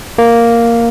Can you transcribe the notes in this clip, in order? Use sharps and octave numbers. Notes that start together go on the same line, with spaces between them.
A#3